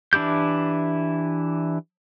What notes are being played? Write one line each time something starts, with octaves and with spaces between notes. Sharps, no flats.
E3 D4 E4 G4 G6